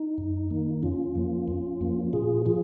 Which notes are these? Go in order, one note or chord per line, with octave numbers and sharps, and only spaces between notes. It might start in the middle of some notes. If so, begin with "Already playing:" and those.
Already playing: D#4
F#2
D#3 A#3
F2 C#4 F4
F3 A#3
F2
F3 A#3
A#2 F4 G#4
F3 F4 G#4